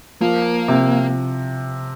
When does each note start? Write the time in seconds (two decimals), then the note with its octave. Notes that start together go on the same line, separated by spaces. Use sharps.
0.21 F3 A#3
0.68 C3